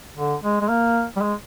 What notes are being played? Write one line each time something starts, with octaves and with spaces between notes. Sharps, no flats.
D3
G#3
G#3
A#3
G3
G#3